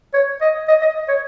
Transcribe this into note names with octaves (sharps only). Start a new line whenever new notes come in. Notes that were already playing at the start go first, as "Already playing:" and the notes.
C#5
D#5
D#5
D#5
C#5